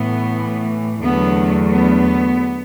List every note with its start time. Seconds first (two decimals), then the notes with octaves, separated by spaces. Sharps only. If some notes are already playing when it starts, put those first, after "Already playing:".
Already playing: A2 E3 A3 B3
1.03 E2 D3 F#3 A3 B3
1.71 B3